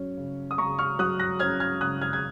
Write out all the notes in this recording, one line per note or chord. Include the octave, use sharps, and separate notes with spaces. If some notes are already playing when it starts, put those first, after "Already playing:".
Already playing: F#3 C#4
C#3
D#6
C#3 A#5 C#6
C#6 F6
F#3 D#6 F#6
F#6 A#6
C#4 F6 G#6
F6 G#6
C#3 D#6 F#6
F6 G#6
G#6